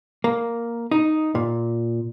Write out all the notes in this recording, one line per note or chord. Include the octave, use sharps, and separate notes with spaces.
A#3
D#4
A#2